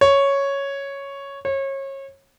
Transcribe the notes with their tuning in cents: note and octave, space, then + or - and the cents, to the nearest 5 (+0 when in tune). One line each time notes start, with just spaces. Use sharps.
C#5 +0
C#5 -30